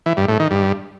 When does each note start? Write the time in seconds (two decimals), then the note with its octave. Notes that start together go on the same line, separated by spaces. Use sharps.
0.06 E3
0.17 G2
0.28 A2
0.40 D#3
0.51 G2